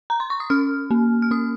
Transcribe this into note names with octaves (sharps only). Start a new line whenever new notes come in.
A#5
C6
C#6
D#6
C#4 F6
A#3
F6
C#4 D#6